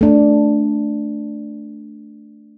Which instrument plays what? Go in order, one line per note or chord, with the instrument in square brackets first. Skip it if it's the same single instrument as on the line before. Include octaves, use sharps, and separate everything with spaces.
[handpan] A3 D4